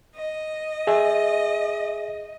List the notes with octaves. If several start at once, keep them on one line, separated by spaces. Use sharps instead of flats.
D#5
G#4 E5